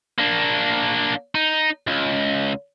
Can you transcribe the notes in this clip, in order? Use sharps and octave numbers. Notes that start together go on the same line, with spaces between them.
A#3 D4
D#4
C#2